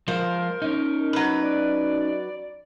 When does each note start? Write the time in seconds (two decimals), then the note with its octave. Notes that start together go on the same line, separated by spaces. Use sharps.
0.08 F3 G#3 F4 A#4 C5
0.62 C#4 D#4
1.13 F#3 B4
1.42 D5